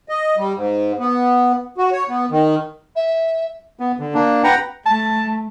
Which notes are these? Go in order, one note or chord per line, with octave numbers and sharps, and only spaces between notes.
D#5
G3
G#2
B3
F#4
C#5
B3
D#3
E5
B3
D3
A#3 D4
B4 F#5 G5 A#5
A3 A5